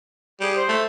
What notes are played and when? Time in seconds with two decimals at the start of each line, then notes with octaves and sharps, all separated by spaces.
0.41 G3 G#4
0.55 C5
0.69 A3